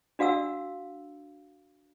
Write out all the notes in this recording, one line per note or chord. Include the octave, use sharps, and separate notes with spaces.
D4 F#4 F5 F#5 E6